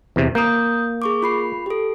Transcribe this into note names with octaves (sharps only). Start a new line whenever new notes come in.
E2 C3
A#3 D#6 G6
G#4 C#6 D6
F4 B5 C7
G4 A4